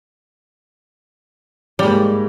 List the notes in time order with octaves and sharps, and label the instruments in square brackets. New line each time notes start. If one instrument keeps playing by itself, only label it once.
[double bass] G#2 A#3 [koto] G3